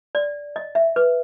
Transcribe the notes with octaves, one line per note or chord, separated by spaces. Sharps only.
D5
D#5
E5
B4